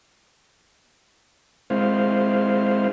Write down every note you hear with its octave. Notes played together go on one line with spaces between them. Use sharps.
G#3 C4 E4 C5 F5